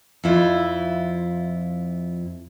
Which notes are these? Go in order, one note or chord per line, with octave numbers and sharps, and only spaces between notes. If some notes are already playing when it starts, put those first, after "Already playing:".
F2 E4 F4